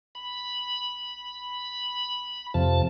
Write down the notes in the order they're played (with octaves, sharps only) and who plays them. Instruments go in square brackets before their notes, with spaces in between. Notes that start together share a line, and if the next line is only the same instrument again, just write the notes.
[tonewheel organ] B5
F2 C3 F3 A5